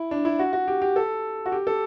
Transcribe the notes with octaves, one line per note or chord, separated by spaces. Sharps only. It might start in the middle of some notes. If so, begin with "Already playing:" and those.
Already playing: E4
D4
E4
F#4
F#4
G4
G4
A4
F#4
G4
A4